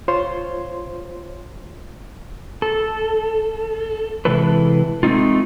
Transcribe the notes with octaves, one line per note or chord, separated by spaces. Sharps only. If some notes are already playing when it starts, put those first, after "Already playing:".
F4 C5 C#5 C6
A4
C3 E3 G#3 E4 A4 B4
G#3 A3 C4 D#4 F4